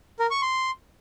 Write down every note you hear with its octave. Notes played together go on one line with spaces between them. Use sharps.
A#4
C#6
C6